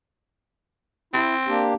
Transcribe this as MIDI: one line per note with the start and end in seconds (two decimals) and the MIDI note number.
1.14 1.68 60
1.14 1.35 64
1.47 1.74 58
1.47 1.74 62
1.47 1.74 67